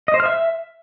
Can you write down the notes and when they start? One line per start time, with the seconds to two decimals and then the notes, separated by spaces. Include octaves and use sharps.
0.08 D#5
0.14 C5
0.20 F6
0.26 E5